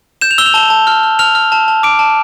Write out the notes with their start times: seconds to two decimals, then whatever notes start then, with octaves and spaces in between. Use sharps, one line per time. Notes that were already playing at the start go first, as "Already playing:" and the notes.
0.21 G6 E7
0.31 F7
0.38 E6 G7
0.46 F7
0.54 A5 G7
0.70 A5
0.87 F6
1.03 F6
1.19 F6 F7
1.35 F6
1.52 A5
1.68 A5
1.83 D6 D7
1.99 A5